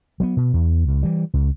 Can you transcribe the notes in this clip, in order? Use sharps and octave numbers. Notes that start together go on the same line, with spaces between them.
F#3 G#3 B3
B2
E2
C#2
E3 G3
C#2